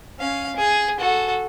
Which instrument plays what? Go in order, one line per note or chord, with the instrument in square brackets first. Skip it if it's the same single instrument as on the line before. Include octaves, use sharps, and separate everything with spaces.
[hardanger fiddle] C#4 F5
G#4
F#4 A4